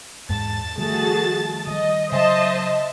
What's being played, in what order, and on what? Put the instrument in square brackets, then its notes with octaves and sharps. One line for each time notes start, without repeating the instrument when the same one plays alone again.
[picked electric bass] E2 G#2 G#3 [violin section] A5 A6
[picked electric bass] D#3 F3 G3 [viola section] A3 F#4 G#4
[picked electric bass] D#3 G3 [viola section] D#5
[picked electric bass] C#3 F#3 [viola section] C5 D#5 [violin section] E5 A5 C6